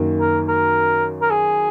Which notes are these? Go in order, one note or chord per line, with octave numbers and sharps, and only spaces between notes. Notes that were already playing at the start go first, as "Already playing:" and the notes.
Already playing: F#2 D#3 A#3
A#4
A#4
A#4
G#4